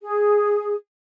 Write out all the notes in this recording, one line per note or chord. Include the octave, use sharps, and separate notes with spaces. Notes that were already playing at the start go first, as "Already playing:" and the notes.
G#4